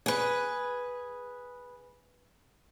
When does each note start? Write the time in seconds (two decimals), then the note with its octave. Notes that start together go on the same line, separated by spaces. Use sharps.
0.06 G#4 B4